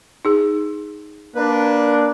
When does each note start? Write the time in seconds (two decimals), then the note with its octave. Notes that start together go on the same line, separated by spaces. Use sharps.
0.25 D#4 G#4
1.35 A#3 D4 B4